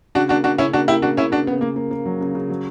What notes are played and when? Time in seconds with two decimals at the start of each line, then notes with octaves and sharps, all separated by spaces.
0.15 C#3 D4 F#4
0.29 A#3 D4 F#4
0.44 C#3 D4 F#4
0.58 C#3 C#4 E4
0.73 A#3 D4 F#4
0.88 A#3 E4 G4
1.02 C#3 D4 F#4
1.17 C#3 C#4 E4
1.32 C#3 D4 F#4
1.47 C#3 B3
1.61 C#3 A#3
1.76 A#3
1.91 A#3
2.06 F#3
2.21 C#3
2.35 C#3
2.50 F#3